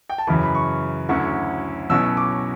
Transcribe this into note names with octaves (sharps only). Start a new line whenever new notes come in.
G5
A5
F#2 C#3 E3 B5
B5
C#6
D2 D3 F#3 C#4 E4 C#6
B1 B2 F#3 C#4 E4 E6
D6